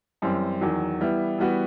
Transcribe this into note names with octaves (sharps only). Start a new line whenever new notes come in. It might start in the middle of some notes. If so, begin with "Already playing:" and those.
F#2 E3 G3 C4
E2 D#3 F#3
E3 G3 B3 E4
E3 G3 B3 F#4